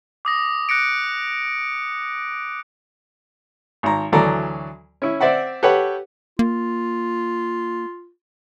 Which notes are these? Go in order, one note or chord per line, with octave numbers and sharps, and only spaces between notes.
D6 D#6 A#6
F#6 A#6 C#7 D7
G#1 A#5
D2 E3 F#3 A4 D5 A#5
C#4 E4
C4 D5 E5 F#5
G4 A4 B4 C#5 F#5 G5
A#3 F4